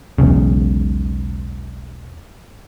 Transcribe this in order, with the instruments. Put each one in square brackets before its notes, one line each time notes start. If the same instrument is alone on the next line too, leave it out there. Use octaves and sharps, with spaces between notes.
[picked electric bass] E1 B1 C#3